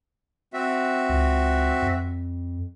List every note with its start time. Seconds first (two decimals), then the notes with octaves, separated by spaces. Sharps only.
0.53 C4 F#4 E5
1.09 C#2
1.82 F2